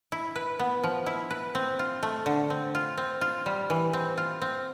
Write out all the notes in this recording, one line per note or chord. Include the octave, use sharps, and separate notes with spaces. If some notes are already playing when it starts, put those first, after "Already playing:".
E4
B4
B3
F3
E4
B4
C4
F4
A3
D3
C4
F4
C4
F4
G3
E3
C4
F4
C4